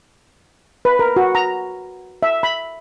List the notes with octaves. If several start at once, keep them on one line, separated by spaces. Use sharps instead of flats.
B4
A#4
F#4
A#5
E5
B5